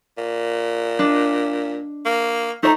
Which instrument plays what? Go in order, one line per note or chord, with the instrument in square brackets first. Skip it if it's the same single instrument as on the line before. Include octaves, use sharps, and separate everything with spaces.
[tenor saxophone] A#2
[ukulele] D4 D#5
[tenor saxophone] A#3
[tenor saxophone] A3 [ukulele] D#4 C#5 A#5